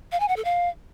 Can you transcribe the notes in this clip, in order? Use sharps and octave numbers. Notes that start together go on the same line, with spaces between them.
F5
G#5
F#5
A4
F5